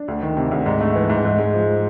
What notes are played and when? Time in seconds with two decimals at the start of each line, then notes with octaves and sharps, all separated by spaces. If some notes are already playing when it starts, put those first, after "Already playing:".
Already playing: D4
0.08 D2
0.22 D#3
0.37 C3
0.51 D2
0.66 G#2
0.81 A3
0.95 E3
1.10 G#2
1.25 G#2
1.39 G#3
1.54 F3